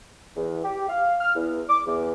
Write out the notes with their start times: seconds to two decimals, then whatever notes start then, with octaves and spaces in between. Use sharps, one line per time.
0.36 E2
0.63 G4
0.88 F5
1.21 F6
1.35 E2
1.69 D6
1.86 E2